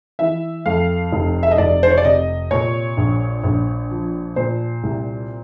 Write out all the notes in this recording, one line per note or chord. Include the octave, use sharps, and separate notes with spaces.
E3 E5
F2 F5
F1
E5
D#5
F1 D5
C5
C#5
D5
C3 D#5
A#2 C#5
A#1
A#1
F3
A#2 C5
C2